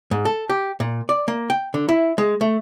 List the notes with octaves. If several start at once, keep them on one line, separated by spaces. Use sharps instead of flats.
G#2
A4
G4
A#2
D5
A#3
G5
D3
E4
G#3
A3